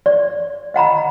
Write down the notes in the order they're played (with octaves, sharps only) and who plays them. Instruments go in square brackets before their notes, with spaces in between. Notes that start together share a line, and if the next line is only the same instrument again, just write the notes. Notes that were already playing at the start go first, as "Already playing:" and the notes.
[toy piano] D5
D#5 F#5 A#5 B5